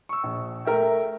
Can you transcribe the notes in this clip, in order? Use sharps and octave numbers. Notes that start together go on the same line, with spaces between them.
C#6 E6
A#1
A3 A#4 E5 G5